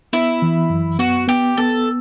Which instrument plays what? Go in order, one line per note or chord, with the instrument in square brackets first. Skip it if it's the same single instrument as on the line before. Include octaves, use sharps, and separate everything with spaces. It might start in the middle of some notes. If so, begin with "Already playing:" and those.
[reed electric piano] B3 [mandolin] E4
[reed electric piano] E3
F#2
[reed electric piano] B3 [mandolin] F#4
[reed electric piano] B3 [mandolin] G4
[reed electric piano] B3 [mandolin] A4